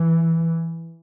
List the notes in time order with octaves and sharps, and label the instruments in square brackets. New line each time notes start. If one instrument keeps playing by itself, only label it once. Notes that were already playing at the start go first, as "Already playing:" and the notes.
Already playing: [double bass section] E3